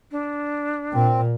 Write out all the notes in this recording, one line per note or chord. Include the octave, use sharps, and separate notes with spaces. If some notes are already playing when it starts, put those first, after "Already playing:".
D4
A#2 C4